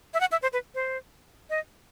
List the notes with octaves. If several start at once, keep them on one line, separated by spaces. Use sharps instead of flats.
E5
F#5
E5
C5
B4
C5
D#5